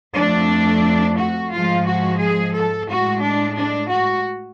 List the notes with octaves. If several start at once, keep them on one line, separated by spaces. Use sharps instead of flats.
F2 F3 A3 D4
F#4
G#2 F3 G#3 F4
F#4
G#4
A4
A2 G#3 F#4
D4
D4
F#4